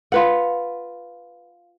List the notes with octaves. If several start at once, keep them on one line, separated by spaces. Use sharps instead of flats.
F4 B4 F#5